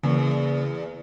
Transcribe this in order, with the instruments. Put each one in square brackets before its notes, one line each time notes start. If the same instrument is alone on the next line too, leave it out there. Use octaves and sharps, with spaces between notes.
[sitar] E2 [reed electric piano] C#3 A#3